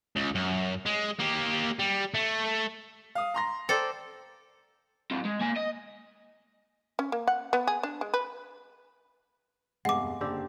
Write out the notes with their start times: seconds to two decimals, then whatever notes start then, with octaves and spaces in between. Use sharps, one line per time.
0.16 C#2
0.35 F#2
0.86 G#3
1.20 A#3 G4
1.79 G3
2.14 A3
3.15 F5 D#6
3.34 A#5 C6 A#6
3.69 A4 C5 D5 G5
5.11 F#3 C4
5.25 G#3
5.41 A#3 G#5
5.56 D#5
6.99 C#4
7.12 A#3
7.27 F#5
7.53 B3
7.67 G#4
7.83 D4
8.01 G#3
8.14 B4
9.85 F1 E2 G2 G#3 F#5 D6
10.21 F#1 D3 C4 G4 E6